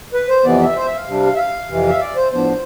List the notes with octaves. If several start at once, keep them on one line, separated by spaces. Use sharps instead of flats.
B4
C5
F2 C3 E3 B3 D5
E5
C5
E5
F5
C3 G3 D4
E5
F5
F2 C3 E3
E5
D5
C5
A2 F3 B3 D4 C5